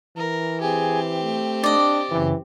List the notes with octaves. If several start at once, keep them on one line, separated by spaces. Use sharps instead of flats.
E3 A#4
C4 G4 G#4 G#5
A3
D4 D5 D#5
F#2 C#3 E3